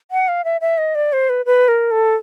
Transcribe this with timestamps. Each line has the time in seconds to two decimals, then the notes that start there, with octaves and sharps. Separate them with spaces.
0.11 F#5
0.28 F5
0.44 E5
0.61 E5
0.78 D#5
0.95 D5
1.13 C5
1.29 B4
1.46 B4
1.68 A#4
1.91 A4